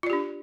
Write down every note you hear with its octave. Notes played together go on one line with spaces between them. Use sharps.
D4 F4 G4 D5